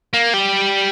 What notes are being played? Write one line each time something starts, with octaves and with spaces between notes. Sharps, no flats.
A#3
G3